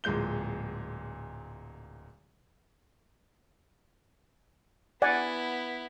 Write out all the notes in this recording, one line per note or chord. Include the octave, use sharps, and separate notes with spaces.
D1 A#2 G#3 G6 G7
B3 E4 D5 F#5 G#5